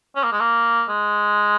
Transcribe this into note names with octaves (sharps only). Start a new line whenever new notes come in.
C#4
A#3
G#3
A#3
G#3